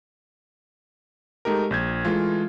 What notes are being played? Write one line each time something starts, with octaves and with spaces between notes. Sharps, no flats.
G#3 A3 D#4 G4 A#4
A#1 G6 G#6
E3 G#3 A3 F4